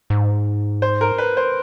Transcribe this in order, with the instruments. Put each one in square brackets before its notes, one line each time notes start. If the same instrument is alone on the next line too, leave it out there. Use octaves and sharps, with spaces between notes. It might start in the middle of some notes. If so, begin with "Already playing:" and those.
[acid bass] G#2
[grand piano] C5
A#4
B4
C5